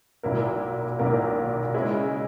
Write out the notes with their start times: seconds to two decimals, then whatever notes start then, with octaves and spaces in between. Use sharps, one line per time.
0.23 B1 A#2 A#3 E4 A#4
0.99 B1 A#2 A#3 E4 A#4
1.74 C#3 G#3 C#4 E4